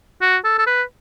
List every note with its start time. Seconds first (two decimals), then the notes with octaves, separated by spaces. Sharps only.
0.21 F#4
0.44 A4
0.58 A4
0.66 B4